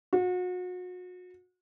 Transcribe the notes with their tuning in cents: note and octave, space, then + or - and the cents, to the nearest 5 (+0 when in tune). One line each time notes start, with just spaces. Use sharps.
F#4 -35